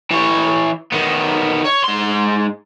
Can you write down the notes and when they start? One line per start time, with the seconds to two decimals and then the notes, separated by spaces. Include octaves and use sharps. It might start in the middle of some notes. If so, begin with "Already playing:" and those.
0.11 E3 C#5
0.92 D#3 B3
1.64 C#5
1.84 G#2 C6